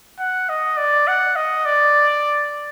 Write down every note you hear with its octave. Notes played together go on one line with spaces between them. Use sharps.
F#5
D#5
D5
F#5
D#5
D5